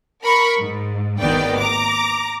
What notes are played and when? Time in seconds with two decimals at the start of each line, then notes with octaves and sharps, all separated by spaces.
0.24 A#4 B5 C#6
0.62 G#2
1.19 G#1 D#2 D#3 B3 D5 G5
1.57 A#5 D6